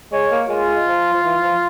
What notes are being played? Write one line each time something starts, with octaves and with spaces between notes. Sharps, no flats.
G#3 C#5
A#3
G#3 F4
F3
F3
E3
F3